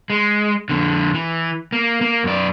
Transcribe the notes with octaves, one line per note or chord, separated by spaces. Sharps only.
G#3
F2 D3
E3
A#3
A#3
F#2 D5